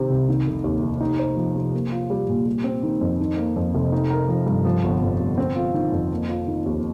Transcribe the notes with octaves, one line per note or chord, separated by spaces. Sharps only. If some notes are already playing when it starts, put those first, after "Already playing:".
Already playing: C3 D#3 C4
C2
D#3
F1
D#2
F1
D#4
C5
F3
C3
A#3
F4
G3
A#2
G3
C4
D#3
F2
D#3
A#3
F2
F1
D#4
A#4
F3
G2
F3
G1
F2
G1
C4
F4
D#3
F2
A#3
F4
D#3
D#2